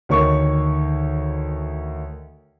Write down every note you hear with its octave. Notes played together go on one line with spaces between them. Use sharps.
D2 D#3 C#5 C#6